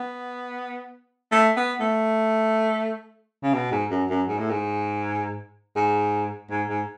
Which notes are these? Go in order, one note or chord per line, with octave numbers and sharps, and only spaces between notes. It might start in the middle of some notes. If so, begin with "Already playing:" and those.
Already playing: B3
A3
B3
A3
C#3
B2
G#2
F#2
F#2
G#2
A2
G#2
G#2
G#2
G#2